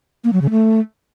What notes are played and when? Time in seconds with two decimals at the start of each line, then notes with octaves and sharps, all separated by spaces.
0.24 A#3
0.33 F#3
0.42 C#3
0.50 A3